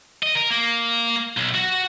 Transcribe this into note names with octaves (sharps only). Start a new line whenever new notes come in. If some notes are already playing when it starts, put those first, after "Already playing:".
D#5
A#4
A#3
B1
F#4